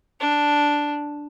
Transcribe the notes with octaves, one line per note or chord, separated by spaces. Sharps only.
D4